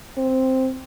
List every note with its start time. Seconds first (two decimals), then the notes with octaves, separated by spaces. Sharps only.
0.17 C4